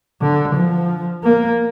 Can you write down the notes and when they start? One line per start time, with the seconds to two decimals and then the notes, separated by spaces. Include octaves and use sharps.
0.22 D3
0.55 F3
1.24 A#3